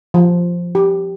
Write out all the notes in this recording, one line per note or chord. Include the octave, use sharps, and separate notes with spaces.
F3
G4